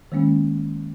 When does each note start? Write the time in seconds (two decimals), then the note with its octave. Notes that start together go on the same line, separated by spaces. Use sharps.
0.12 D#3 G#3 A#3 C#4